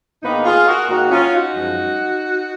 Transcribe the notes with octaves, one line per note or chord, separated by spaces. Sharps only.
G#2 D#3 A#3 B3 D#4
F4 G#4
F#4 A#4
G#2 D#3 A#3 D#4 F#4
C#4 F4
D#4 F#4
F#2 F3 G#3